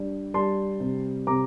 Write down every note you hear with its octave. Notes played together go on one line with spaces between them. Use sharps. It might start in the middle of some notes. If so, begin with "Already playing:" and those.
Already playing: G3 D4
G3 A5 C6
C3
C3 A#5 D6